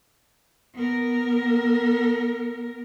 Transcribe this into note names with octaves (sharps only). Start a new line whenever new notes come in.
B3 A#4